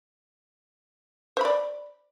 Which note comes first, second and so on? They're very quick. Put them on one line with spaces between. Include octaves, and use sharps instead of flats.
C5 B5 D5